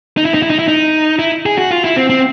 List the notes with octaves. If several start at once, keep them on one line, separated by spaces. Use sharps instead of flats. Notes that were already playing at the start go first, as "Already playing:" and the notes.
D#4
E4
D#4
E4
D#4
E4
D#4
E4
G#4
F#4
F4
E4
C4
C4